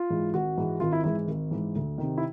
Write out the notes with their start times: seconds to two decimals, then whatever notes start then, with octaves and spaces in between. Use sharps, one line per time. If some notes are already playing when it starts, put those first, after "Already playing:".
Already playing: F4
0.10 G#2 E3 G#3
0.33 G#1 F#4
0.57 G#2 E3 G#3
0.80 G#1 F4
0.93 E4
1.04 G#2 E3 G#3 E4
1.28 G#1
1.51 G#2 E3 G#3
1.75 D2
1.98 C3 D#3
2.18 E4